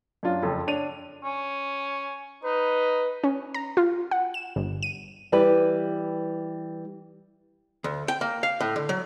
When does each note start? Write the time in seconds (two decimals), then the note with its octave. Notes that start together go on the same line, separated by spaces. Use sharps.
0.23 F#2 D4 F4
0.42 F#1 F2 A4
0.67 D4 C#5 D#7 F7
1.24 C#4
2.44 D#4 B4
3.24 C#4
3.54 A#5
3.77 F4
4.11 F#5
4.34 E7
4.56 G1
4.83 D#7
5.32 E3 G3 E4 G4 B4
7.84 D2
8.08 G5
8.21 A#3
8.43 F5
8.60 A2
8.76 D3
8.89 F#3